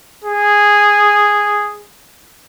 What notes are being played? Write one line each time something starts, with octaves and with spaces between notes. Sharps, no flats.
G#4